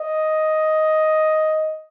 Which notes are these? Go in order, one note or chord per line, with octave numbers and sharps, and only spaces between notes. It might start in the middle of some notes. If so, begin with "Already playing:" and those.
Already playing: D#5